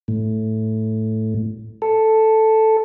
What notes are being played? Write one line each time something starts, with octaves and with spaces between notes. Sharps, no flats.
A2
A4